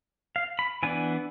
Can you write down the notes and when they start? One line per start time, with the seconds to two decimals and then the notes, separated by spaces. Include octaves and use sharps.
0.36 F5
0.59 B5
0.83 E3 B3 D4 G#5